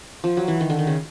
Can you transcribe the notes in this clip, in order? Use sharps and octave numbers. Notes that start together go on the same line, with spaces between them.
F3
F#3
E3
D#3
D3
D#3
C#3